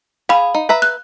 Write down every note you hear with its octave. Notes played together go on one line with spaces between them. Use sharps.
G#4 F5 B5
D#4
B4 E5 A#5
F#6